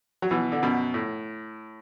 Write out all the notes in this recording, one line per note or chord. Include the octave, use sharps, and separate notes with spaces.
F#3
B2 E3
D3
F#2 B2
A2